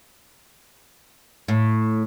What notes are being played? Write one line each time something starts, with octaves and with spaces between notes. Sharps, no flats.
A2